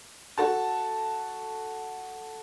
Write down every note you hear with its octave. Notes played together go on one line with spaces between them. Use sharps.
F#4 A4 A5